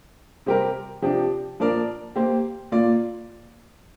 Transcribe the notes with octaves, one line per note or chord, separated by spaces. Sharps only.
C3 G3 C4 G4 A#4
C3 F3 D4 G4
A#2 F3 D4 A#4 D5
A#3 G4 C5
A#2 A#3 F4 D5